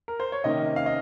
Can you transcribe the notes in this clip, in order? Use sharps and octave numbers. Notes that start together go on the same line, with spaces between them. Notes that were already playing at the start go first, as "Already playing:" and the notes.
A#4
C5
C#5
C3 D#3 A#3 C#4 D#5
F5
D#5